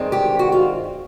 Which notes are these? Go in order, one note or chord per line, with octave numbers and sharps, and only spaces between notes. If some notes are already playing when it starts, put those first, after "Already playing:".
Already playing: G2 D#3 G#3 C4
G4
F#4
F4